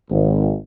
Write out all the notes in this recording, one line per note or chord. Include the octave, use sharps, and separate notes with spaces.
G#1